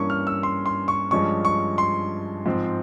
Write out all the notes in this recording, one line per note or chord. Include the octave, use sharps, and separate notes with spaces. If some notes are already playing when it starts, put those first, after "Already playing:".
Already playing: G2 E3 A#3 C#4 C#6
F6
E6
C6
C6
C#6
G2 F3 G#3 C#4 C#6
C#6
C6
G#2 F3 C4